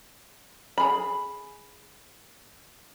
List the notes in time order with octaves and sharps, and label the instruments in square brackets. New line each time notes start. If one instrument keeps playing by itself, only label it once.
[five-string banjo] G#4 B5